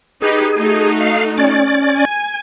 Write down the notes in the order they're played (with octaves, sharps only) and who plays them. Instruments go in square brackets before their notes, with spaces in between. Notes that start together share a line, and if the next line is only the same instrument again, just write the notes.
[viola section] D#4 G4 B4 [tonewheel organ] G#4
[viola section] A3 D#4 F#4
[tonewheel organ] F5
C#4 D5
[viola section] G#5